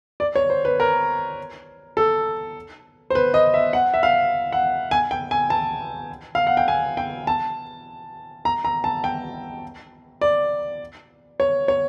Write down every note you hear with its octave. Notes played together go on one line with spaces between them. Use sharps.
D5
C#5
C5
B4
A#4
A4
C5
B4
D#5
E5
F#5
E5
F5
F#5
G#5
G5
G#5
A5
F5
F#5
G5
G#5
G5
A5
A#5
A#5
A5
G5
D5
C#5
C#5